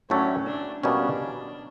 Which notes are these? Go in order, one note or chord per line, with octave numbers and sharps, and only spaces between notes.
A2 F#3 A3 C#4 D4
D4
B2 G3 A#3 C#4 D4